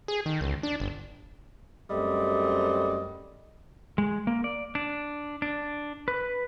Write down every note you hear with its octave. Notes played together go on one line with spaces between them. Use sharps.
G#4
D#3
C#2
D4
G1
F#2 G3 A3 C4 D#5
G#3
A#3
D5
D4
D4
B4